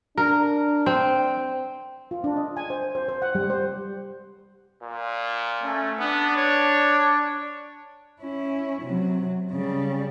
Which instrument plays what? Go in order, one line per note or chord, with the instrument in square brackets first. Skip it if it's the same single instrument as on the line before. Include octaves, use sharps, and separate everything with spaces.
[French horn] D4 [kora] A#4
[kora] C4
[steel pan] F4
D4
D#5
G#5
C5
C5
C5
F#5
G3
C5
[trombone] A#2
[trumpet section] A3 C#4
[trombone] B3 [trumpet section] D4
[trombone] C#5
[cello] C#4 E4
C3 F#3
C#3 G3